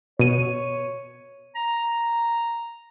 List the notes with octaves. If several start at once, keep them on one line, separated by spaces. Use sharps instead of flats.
B2 C#5 D#7
A#5